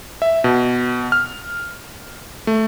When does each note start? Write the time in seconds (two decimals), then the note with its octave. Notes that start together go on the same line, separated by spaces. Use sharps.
0.22 E5
0.44 B2
1.12 F6
2.47 A3